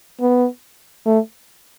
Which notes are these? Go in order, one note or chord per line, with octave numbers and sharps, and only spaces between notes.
B3
A3